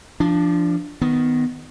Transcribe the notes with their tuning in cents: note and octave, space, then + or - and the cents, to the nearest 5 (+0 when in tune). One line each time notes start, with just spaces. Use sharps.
F3 -20 D4 +0
D#3 +0 B3 +15